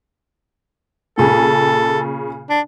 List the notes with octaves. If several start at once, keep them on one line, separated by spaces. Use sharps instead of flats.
A#2 C#3 G#4 A4
D4